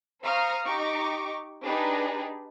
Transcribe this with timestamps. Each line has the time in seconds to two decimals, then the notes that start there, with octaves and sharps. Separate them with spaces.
0.24 C5 F5 A#5 C#6 D#6 F6
0.65 D#4 G4 C#6 D6 D7
1.65 D4 D#4 G4 G#4 B4